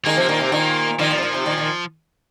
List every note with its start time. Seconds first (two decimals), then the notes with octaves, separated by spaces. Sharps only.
0.05 D#3 G#3 A#3
0.16 C3 F3
0.29 A#2 D#3
0.41 C3
0.52 A#2 D#3
0.99 A#2 D#3 F3
1.11 A#2
1.18 C3
1.23 A#2
1.34 C3
1.46 A#2 D#3
1.57 A#2 D#3